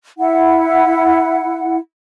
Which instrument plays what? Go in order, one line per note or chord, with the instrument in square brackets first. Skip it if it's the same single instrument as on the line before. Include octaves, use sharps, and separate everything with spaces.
[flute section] E4 F#5